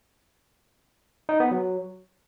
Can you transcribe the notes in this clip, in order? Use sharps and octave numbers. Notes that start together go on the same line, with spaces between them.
D#4
B3
F#3